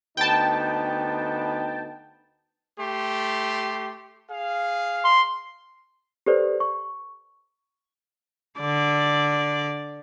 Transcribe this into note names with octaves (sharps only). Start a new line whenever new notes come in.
D2 B3 D#4 G5 A5
A3 G4 C6
G#4 F5
C6
G4 A4 B4 C5 D5
C#6
D3 D5